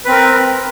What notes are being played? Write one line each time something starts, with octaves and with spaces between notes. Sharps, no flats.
C4 A#4 B4